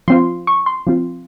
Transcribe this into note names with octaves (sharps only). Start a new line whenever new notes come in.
F3 C4 F4 C6
C#6
C6
F3 C4 F4